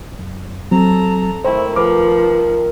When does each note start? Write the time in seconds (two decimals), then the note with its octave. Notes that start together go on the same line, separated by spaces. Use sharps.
0.19 F#2
0.71 F#3 C4 A4 A#5
1.44 D#3 A3 C4 E4 C5
1.76 F3 A#4 B4 D6